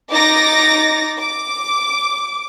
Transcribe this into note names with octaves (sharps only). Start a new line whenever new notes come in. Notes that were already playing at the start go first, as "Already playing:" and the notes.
D#4 D6 A6 A#6
D6